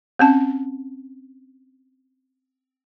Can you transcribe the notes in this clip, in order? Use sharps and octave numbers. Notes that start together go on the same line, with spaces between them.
C4 C#4 A5